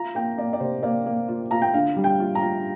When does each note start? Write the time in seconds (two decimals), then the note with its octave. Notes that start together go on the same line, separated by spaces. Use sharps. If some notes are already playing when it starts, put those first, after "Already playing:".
Already playing: F4 A#5
0.15 A#3 G5
0.38 A#3 D5
0.53 D5
0.60 C3 C5
0.83 A#3 D5
1.06 A#3
1.28 F4
1.51 F4 A#5
1.62 G5
1.74 D3 F5
1.96 G3
2.04 G5
2.20 F4
2.35 A#5
2.42 F4